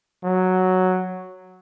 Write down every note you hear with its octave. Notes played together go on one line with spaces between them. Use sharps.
F#3